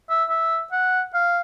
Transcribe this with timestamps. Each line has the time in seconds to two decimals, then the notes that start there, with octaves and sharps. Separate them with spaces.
0.10 E5
0.30 E5
0.72 F#5
1.14 F5